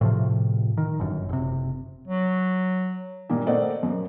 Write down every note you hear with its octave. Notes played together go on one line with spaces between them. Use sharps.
A2 C3 F3
D#3
G1 F#2
F#1 C3
F#3
G2 A#2 D#3 A#3
A3 A#3 C4 D5 D#5 F#5
F#2 A#3